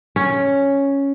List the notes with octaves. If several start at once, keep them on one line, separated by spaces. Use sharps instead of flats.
C#4